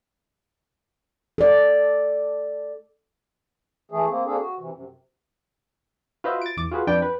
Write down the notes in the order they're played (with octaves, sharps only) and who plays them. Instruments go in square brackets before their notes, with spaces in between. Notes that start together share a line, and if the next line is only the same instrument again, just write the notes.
[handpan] A4 D5
[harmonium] E3 A3 G#4
A#3 C4
A#3 C4 D4 G#4 A4
F#4
C3 E3
F#2 C3
[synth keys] F4 F#4 B4 C5 D#5 E5
A6 D7
E2 D6
F4 F#4 G#4 B4
F2 D4 B4 D5 G5
B4